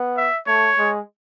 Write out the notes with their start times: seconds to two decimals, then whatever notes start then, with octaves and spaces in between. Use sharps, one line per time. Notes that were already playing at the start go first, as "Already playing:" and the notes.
Already playing: B3
0.17 E5
0.47 A3 C#5
0.78 G#3